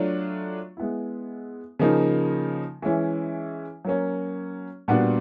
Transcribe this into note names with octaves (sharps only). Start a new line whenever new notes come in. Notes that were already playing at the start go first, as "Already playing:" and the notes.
Already playing: F#3 A3 D4 F4
G#3 B3 E4
C#3 F3 A#3 D#4
E3 G#3 C#4 E4
F#3 A#3 C#4
A#2 G3 B3 D4 F#4